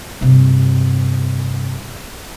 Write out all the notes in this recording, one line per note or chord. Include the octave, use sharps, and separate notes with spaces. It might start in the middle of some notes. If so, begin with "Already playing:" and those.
G2 C3